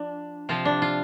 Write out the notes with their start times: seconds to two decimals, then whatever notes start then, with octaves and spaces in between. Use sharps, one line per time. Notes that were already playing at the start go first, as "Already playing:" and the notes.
Already playing: F3 D4
0.49 C3 F3 F4
0.65 D4
0.82 F4